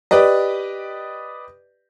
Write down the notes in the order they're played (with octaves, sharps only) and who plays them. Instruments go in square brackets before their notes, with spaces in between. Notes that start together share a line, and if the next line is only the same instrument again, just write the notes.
[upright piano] G4 B4 D5 D#5